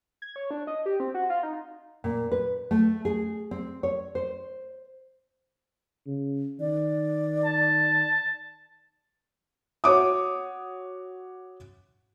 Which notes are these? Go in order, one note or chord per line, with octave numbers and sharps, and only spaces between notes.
G#6
C#5
D4
D#5
G4
C4
F#4
F4
D#4
A#2
B4
A3
G#4
C4
C#5
C5
C#3
D#3 D5
A5
F#4 C#5 D6 D#6